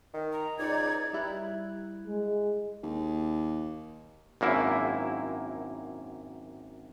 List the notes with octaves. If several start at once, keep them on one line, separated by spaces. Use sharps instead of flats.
D#3
A#5
C#2 D#4 D5 G#6
G3 E4 F#6
G#3
D#2
G#1 F#2 A#3 E4